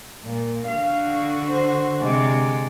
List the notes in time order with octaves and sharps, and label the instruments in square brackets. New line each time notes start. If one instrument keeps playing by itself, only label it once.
[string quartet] A#2
[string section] D3 F#4 [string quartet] F5
[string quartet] C5
C3 G#3 D5